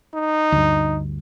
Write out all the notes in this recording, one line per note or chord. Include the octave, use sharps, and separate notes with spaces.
D#4
D2 G2